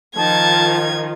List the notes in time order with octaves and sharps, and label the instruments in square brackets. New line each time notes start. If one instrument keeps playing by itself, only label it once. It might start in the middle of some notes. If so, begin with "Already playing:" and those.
[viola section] D#3 F3 F4 [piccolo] A5 [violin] G#6